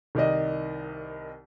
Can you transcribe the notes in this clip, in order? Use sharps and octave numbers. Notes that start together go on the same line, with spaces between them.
C2 D#3 D5 D#5